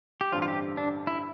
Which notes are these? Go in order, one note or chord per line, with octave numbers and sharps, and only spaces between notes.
G4
A1 G2 D3 G3 C4 F4
F4
G4
D4
E4